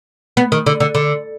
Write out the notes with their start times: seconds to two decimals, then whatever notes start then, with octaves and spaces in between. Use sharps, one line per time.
0.37 B3
0.52 D#3
0.66 D3
0.80 D3
0.95 D3